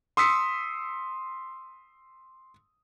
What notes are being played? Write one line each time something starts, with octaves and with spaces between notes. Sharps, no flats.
C6 D#6 E6 B6 C#7